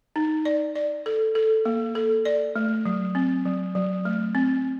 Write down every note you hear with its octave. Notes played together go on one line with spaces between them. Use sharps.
D#4
D5
D5
A4
A4
A#3
A4
D5
A3
F#3
C4
F#3
F#3
A3
C4